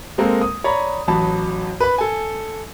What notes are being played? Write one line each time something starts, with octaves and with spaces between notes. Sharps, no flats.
G#3 A#3 C4 A4 A#4
D#6
C#5 D5 A#5 B5
A1 F#3 A5 B5
B4 B5
A4 G#5